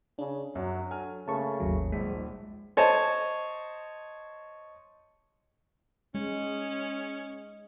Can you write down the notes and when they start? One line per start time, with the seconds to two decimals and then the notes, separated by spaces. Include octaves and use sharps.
0.19 C#3 D4
0.55 F#2 F#3
0.91 A4 G#5 F6
1.28 C#3 A3 A#3 A5 C#6
1.60 G#1 D#2 F#3
1.92 D#1 A#1 G#2 G#3 B6
2.77 C5 C#5 D#5 A5
6.15 G#3 C#4